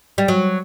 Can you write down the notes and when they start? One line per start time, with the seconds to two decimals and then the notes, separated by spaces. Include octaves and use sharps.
0.18 G3
0.28 F#3